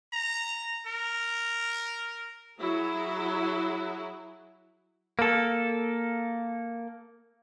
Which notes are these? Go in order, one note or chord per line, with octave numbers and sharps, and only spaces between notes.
A#5
A#4
F#3 E4 G#4
A#3 A4